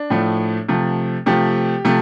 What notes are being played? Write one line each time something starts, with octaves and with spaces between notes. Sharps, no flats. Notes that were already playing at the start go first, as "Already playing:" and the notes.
Already playing: D4
A2 F3 A3
C3 F3 A3
C3 F3 A3 G4
C3 F3 A3